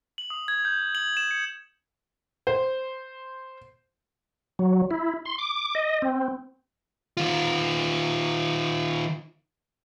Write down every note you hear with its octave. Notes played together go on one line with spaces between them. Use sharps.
F#7
D#6
G#6
G6
F#7
E7
C#7
C5
F#3
E4
C6
D6
D#5
C4
D#3 F4